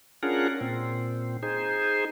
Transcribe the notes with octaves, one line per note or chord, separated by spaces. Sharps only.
C#4 D4 F4 G#4 A#4 F#5
A#2 C4
D#4 G#4 C5